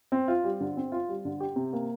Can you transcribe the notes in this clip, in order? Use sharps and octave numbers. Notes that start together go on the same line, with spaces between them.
C4
F4
G3
D3
C4
F4
G3
D3
G4
C3
A#3